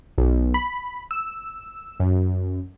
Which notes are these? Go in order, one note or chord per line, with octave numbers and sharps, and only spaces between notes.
B1
B5
E6
F#2